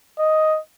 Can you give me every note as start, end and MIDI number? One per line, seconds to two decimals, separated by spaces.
0.19 0.59 75